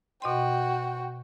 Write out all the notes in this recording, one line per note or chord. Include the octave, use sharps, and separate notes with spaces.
B2 F#4 D#5 G5 C6